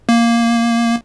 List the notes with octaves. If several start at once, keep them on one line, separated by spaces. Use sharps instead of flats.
A#3